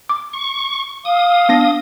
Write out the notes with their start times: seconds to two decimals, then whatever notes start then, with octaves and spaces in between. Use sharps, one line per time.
0.09 D6
0.33 C#6
1.05 F5 D#6
1.49 B3 D4 A#6